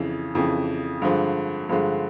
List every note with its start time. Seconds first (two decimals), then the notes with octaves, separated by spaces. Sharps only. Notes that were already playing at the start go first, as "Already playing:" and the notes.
Already playing: F2 C#3 E3
0.35 F2 C#3 E3
1.02 G2 D3 F3 G#3
1.69 G2 D3 F3 G#3